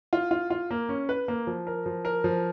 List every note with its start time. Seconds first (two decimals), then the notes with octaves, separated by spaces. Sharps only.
0.13 F4
0.31 F4
0.50 F4
0.71 A#3
0.89 C#4
1.09 B4
1.28 A#3
1.47 F3
1.67 A#4
1.86 F3
2.05 A#4
2.24 F3